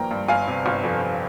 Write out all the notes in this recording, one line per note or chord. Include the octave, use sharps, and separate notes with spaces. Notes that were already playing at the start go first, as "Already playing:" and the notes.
Already playing: G#1 G2 F3 A#3 G5 A#5
G2
G1 F5 G#5
C3
G1
F2
G1